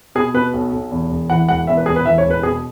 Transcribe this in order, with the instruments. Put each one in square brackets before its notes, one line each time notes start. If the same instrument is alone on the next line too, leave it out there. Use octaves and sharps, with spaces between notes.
[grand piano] B2 G#4
B2 B4
B1
B1
E2
E1
E3 F#5
E1 F#5
E2 E5
B4
E1 G#4
B4
E3 E5
C#5
E1
B4
B2 G#4